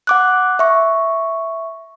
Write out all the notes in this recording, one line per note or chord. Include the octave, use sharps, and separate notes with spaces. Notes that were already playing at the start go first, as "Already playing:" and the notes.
F#5 D6 F#6
E5 C#6